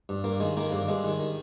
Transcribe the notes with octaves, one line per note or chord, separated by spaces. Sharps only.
G2
G2 A#3
D#3 G#3
D#3 A#3
G2 A#3
G2 G#3
D#3
D#3